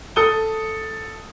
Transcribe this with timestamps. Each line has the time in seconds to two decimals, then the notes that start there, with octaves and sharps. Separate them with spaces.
0.16 A4 D#6 G7